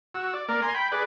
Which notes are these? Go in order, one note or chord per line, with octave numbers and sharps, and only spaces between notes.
F#4 E6
D5
A#3 A#4 D5
G#5 A#5 C6
G5 B5
G#4 B4 D5